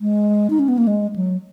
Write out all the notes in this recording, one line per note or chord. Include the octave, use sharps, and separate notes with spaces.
G#3
D#4
C#4
B3
A#3
G#3
F#3